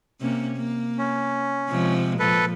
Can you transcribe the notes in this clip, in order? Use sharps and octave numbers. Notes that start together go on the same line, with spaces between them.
C3 A#3 C#4
A#3
C#4
C3 F3 G#3
A#2 F3 A4 B4